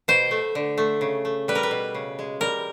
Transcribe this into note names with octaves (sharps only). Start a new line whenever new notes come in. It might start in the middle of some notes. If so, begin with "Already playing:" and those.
B2 C5
A3
D3
A3
C#3
A3
G3 B4
A#4
B4
B2
C#3
G#3
G3 A#4